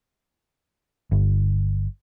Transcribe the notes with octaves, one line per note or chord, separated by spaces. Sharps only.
G1